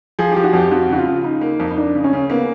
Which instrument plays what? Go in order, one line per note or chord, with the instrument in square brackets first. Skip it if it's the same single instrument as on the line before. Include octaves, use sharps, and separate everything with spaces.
[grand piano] F3 [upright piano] G#4
[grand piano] F3 [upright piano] G4
[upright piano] F#4
[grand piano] F2 [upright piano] G4
[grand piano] F2 [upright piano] F#4
[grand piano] C#3 [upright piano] F#4
[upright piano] F4
[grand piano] C#3
[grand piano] C#3 [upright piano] D#4
[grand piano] A#3
F2
[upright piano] D#4
[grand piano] F2 [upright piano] D4
[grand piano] C#3
[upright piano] C#4
[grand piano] C#3
[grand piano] A#3 [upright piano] B3